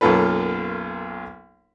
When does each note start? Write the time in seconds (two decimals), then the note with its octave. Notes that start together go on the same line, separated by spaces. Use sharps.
0.01 B1 F#2 A#3 F4 A4 B4